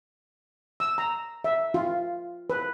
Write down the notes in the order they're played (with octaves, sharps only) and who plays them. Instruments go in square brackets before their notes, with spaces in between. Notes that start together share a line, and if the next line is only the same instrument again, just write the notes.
[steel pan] E6
A#5
E5
F4
B4